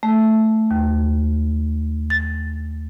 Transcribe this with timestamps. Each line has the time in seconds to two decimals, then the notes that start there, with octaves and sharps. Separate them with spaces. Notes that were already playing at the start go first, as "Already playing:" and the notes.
0.03 A3
0.71 D#2
2.10 A6